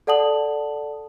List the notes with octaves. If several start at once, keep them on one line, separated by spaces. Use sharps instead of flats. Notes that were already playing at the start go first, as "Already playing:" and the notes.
A4 D5 F#5 A5 D#6 F#7